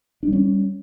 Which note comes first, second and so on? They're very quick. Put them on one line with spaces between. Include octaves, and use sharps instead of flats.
D4 G3 C#4